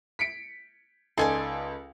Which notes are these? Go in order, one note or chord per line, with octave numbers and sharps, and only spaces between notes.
B6 C#7 D7
C#2 D#4 A4 D5 G#5 C6